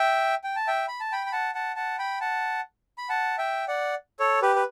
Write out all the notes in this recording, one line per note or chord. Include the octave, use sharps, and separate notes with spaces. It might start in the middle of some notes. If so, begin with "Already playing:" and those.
Already playing: E5 G5
G5
A5
E5 G5
B5
A5
G5 B5
B5
F#5 A5
F#5 A5
F#5 A5
G5 B5
F#5 A5
B5
F#5 A5
E5 G5
D5 F#5
A4 C#5
G4 B4
B4